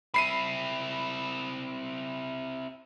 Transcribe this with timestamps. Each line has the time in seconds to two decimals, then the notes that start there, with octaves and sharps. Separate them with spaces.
0.14 C4 E4 B5 C7 D#7